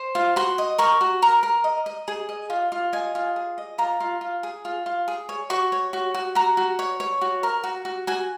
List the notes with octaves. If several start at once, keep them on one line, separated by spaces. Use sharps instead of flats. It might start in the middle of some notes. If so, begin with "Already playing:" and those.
Already playing: C5
F4
F#4 C6
D#5
A#4 C#6
F#4
A#4 A#5
A#4
D#5
D#5
G#4
D#5
F4
F4
D#5 G#5
F4
G#4
D#5
F4 A#5
F4
F4
G#4
F4
F4
G#4
C#5
F#4 C#6
C#5
F#4
F#4
F#4 A#5
F#4
C#5
C#5
F#4
A#4
F#4
F#4
F#4 G#5